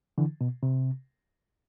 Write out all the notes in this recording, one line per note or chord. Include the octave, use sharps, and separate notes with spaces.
D3 E3
B2
C3